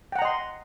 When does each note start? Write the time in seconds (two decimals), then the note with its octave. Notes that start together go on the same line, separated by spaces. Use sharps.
0.12 G5
0.16 F#5
0.19 A#5
0.22 D#5
0.25 C6